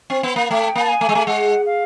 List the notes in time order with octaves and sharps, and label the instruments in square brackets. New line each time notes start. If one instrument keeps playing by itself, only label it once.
[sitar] C4
B3
A#3
[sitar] A3 [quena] G5
[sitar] A#3
[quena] A5
G#5
[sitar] A3
G#3
A3
[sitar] G#3 [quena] F#5
[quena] F5